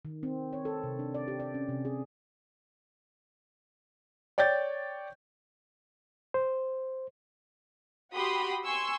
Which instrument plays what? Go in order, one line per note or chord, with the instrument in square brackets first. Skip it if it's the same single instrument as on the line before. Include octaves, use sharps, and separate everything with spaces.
[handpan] D#3
C4
C#5
A4
C3
D4
D5
G4
D5
C#4
C3
G#4
[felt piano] C#5 D5 G5 G6 A6
[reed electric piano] C5
[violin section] F#4 G4 B5 C6 D#6
G#5 C6 C#6 E6